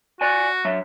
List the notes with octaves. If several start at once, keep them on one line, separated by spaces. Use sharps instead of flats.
F#4 D5 G#5
F#3 E5